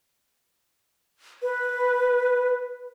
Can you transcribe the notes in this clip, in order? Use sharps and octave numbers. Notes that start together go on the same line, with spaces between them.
B4